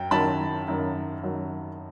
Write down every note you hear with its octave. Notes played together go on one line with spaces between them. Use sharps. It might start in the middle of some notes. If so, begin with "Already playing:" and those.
Already playing: F#2 F#3 G5
F#2 D#3 F#3 A5 B5
F#2 D#3 F#3
F#2 D#3 F#3